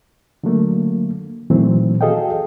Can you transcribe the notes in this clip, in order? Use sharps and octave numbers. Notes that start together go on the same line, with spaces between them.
D3 F#3 A3 A#3
A#2 D#3 E3 F#3 A3 C4
F#4 G#4 A4 D#5 F5 G5